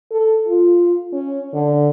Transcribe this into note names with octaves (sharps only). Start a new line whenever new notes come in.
A4
F4
C#4
D3